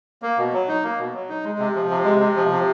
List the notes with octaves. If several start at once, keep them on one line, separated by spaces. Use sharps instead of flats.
A#3
B2
F#3
D#4
A#3
B2
F#3
D#4
G#3
C3
F3
C3
G#3
C3
F3
C3